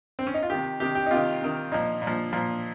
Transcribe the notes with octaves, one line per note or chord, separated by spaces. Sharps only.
C4
C#4
D#4
F4
C3 D#3 G4
C3 D#3 G4
G4
D#4
C3 D#3 F4
C3 D#3
A#2 F3 D#4
A#2
F3
A#2 F3